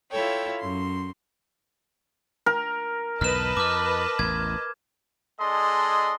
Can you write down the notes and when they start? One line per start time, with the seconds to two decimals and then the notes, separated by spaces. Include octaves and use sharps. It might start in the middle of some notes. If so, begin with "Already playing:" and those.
0.11 E4 F4 A4 C#5 G5
0.60 F#2 C6
2.46 A#4
3.21 B1 E2 G#2 B4 D#5 A5 F6 E7
3.57 F2 D6 F6
4.19 A1 E2 G#6
5.38 G#3 D4 G#4 A4 D#5 C6